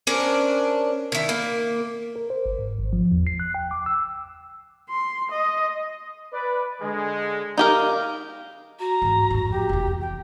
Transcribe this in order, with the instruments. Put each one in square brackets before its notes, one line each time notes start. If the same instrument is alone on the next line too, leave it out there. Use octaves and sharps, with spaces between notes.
[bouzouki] C#4 D4 A#4 C5
D#3 E4
A#3
[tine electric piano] A#4
C5
G1
G#2
G#1
F3
E2
C7
F#6
G5
D6
E6
[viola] C6
D#5
[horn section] B4 D5
D3 G#3
[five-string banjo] D#4 G4 A#4 [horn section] F5
[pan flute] F#4 [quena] A#5
[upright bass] G#2 E3
F2 A2
[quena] G4
[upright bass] F1 E2
[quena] G5